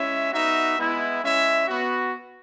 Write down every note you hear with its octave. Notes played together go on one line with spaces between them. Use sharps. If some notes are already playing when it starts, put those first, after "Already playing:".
Already playing: G#3 C#4 E4 E5
B3 D#4 F#4 E5
G#3 B3 E4
G#3 C#4 E4 E5
B3 F#4